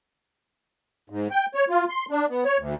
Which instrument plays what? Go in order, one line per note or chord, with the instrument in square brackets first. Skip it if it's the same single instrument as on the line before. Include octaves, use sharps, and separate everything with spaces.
[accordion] G#2
G5
C#5
F4
C6
D4
B3
C#5
D2